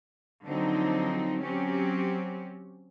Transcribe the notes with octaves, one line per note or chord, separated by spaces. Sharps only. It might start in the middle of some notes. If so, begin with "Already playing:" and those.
D3 F3 F#3 C4 D#4
F#3 C4 C#4 G4